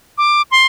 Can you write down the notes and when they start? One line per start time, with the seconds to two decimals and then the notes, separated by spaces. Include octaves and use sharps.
0.18 D6
0.51 C6